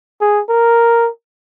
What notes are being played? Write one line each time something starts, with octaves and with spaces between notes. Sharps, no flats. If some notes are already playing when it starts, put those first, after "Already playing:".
G#4
A#4